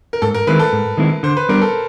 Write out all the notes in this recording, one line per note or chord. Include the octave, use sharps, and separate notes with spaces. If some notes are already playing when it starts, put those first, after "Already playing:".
A#4
G#2 A4
A#4
D#3 G#3 C4 E4 B4
A4
G#2
D#3 G#3 C4 E4
D3 C5
B4
G3 B3 D4 A#4
A4